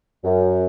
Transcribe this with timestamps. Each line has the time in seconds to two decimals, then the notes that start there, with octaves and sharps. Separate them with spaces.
0.24 F#2